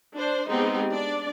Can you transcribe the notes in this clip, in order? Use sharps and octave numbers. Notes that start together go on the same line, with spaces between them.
D4 C5
G#3 B3 C4 D#4 G4 G#4
D4 D5